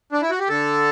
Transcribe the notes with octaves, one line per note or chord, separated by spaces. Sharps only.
D4
E4
F#4
G4
D3 A4